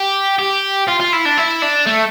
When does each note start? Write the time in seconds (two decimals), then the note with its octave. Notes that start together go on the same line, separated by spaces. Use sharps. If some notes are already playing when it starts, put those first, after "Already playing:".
Already playing: G4
0.39 G4
0.88 F4
1.00 F4
1.13 E4
1.25 D4
1.38 E4
1.62 D4
1.87 A3